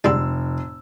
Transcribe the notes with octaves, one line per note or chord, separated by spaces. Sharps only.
F1 D3 G3 G#3 E6